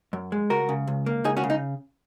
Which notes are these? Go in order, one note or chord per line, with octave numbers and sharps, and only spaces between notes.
F#2
G#3
C#2 F#4 A#4
C#3
C#2
A#3
C#2 D#4 G#4
C#4 F#4
C#3
D#4